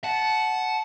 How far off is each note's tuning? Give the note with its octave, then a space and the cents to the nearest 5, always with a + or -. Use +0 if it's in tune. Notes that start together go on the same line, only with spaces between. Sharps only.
F#5 +0 A5 -20